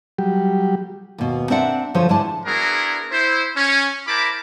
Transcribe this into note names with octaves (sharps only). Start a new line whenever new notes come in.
F#3 G3 G4
D#2 B2
C4 D4 A#4 D5 E5 F#5
D3 F3 F4 A4 C5 C#5
G#2 D3 D4 E4 A5
B3 D4 E4 F#4 G#4 A#4
E4 C5
C#4
E4 A#4 C5 A5 B5 D6